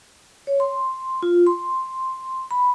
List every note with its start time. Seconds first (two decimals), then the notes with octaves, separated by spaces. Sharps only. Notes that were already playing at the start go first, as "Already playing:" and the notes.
0.47 C#5
0.60 C6
1.23 F4
1.47 C6
2.51 B5